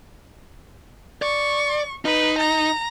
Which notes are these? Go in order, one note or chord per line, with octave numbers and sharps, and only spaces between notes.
D5 C#6
D#4 B4
A#5